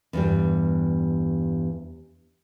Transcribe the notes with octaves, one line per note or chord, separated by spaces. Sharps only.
E2 G2 G3